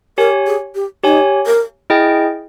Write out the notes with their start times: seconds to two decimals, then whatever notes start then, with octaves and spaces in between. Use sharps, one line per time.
0.18 G4 A#4 C#5 G#5
0.47 G#4
0.75 G4
1.03 D#4 G4 C#5 G#5
1.46 A#4
1.90 E4 G#4 D#5 G5